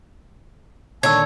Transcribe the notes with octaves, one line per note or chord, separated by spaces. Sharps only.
A#2 D3 D#3 C#5 A5 E6 G#6